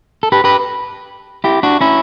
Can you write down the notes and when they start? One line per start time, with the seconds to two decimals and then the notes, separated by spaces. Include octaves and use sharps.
0.23 A4
0.32 G4 B4
0.44 G4 B4
1.44 E4 G4
1.63 D4 F#4
1.81 C#4 E4